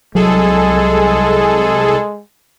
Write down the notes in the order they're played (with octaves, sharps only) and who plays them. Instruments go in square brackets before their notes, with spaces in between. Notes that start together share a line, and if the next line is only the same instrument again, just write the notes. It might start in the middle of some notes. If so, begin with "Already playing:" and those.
[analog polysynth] C2 G#4 A4 [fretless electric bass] F#3 [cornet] G#3